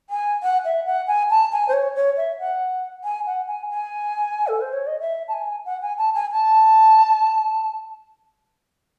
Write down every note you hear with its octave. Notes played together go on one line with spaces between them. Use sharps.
G#5
F#5
E5
F#5
G#5
A5
G#5
C5
C#5
C#5
E5
F#5
G#5
F#5
G#5
G#5
A4
C5
C#5
D#5
E5
A5
G#5
F#5
G#5
A5
G#5
A5